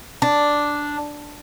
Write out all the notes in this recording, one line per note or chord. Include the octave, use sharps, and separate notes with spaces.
D4